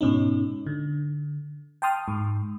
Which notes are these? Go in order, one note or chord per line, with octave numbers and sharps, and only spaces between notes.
G#2 B2 C#4 D#4
D3
G5 A5 C6 D#6 F6
G#2